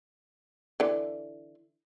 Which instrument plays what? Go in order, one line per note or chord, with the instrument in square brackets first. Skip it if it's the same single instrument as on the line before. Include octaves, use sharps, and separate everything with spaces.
[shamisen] D3 E3